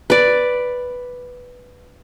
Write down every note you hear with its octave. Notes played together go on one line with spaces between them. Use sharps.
B4 D5